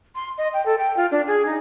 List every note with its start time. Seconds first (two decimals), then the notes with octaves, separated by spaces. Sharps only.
0.15 C6
0.38 D#5
0.54 G5
0.66 A4
0.78 G5
0.97 F4
1.11 D4
1.27 G#4
1.46 D#4